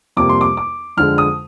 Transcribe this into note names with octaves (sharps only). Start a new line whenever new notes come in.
F2 C3 G3 A#3 D6
C6
D6
D6
F2 D3 G#3 F6
D#6